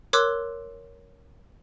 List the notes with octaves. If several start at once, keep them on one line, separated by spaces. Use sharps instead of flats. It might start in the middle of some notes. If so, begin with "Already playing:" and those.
A#4 C#5 C6 D6 E6 F#6